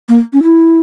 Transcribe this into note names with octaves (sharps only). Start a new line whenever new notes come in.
A#3
C#4
E4